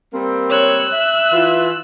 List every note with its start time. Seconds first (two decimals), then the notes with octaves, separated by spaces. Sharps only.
0.13 G3 A#3 C4
0.50 C#5 E6 F#6
0.92 E5
1.32 E3 F4